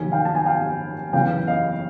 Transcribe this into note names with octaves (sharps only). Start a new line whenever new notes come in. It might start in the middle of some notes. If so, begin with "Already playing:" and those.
Already playing: F1 D#2 D#3 F#3 G#5
F5 G5
A5
G#5
F5 G5
F#1 E2 C#3 F5 G5
D#5 F5